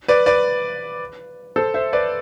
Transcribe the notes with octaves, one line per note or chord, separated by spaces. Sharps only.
B4 D5
B4 D5
A4 C5
C5 E5
B4 D5